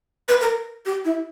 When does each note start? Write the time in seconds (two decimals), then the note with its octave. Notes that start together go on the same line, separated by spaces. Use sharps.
0.28 B4
0.41 A#4
0.86 G4
1.05 E4